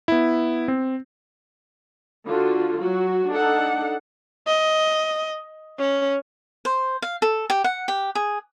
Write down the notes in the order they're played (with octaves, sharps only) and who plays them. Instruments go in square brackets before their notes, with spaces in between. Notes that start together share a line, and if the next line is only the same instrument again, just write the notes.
[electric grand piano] B3 E4
C4
[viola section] D3 F4 F#4
F#3 F#4
D4 D#4 A4 F#5
[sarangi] D#5
C#4
[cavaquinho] C5
F5
A4
G4
F#5
G4
G#4